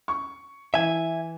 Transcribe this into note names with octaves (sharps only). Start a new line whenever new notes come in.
C#6
E3 E5 G#5